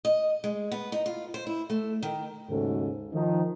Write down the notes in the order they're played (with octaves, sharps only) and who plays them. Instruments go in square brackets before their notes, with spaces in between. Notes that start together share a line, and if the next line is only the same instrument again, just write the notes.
[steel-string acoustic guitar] D#5
G#3
B3
D#4
F4
C5
E4
A3
D#3
[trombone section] D#2 G#2 C#3 A3 F#4 A4
D#3 F3 D#4